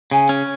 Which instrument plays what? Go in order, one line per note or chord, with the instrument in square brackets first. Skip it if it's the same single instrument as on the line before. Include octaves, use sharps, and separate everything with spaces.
[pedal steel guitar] C#3 [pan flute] G#5
[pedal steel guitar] C#4